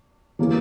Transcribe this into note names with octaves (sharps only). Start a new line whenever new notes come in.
E3 A#3 C#4 G#4